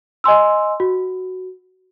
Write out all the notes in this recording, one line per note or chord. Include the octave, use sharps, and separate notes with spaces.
D#5 G#5 C6 E6
F#4